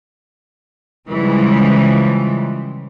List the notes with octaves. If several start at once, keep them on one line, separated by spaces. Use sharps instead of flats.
C#3 E3 F3 G3 G#3